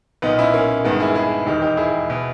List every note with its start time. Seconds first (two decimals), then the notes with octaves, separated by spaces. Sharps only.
0.22 B1 A#2 B3 D#4
0.39 C#4 E4
0.54 A#3 C#4
0.84 G1 G2 D#3 G#3 B3
1.00 E4 G#4
1.15 E4 G#4
1.46 E1 D#2 D#3 D#4 G4
1.62 D#4 G4
1.77 E4 G#4
2.10 B2